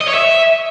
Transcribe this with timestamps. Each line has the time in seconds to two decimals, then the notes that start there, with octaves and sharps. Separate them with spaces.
0.01 D#5
0.07 C#5
0.14 E5